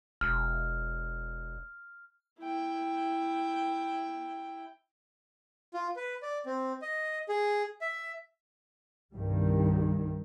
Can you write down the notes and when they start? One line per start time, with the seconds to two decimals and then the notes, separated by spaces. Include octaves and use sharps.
0.21 E1 F6
2.40 E4 G5
5.74 F4
5.96 B4
6.22 D5
6.46 C4
6.82 D#5
7.29 G#4
7.81 E5
9.13 C2 G2 D#3 G3